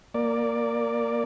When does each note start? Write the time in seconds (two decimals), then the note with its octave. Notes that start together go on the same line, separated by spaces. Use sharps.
0.14 A#3 D5